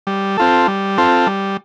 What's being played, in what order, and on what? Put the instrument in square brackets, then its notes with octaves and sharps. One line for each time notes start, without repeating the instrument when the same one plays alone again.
[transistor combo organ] G3
C4 F4 A4
G3
C4 F4 A4
G3